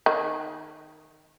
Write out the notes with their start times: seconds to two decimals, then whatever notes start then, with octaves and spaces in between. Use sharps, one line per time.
0.06 D#3